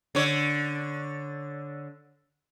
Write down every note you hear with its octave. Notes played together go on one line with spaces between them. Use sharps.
D3 C#5